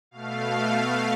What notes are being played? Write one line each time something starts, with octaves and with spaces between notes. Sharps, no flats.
B2 A3 F5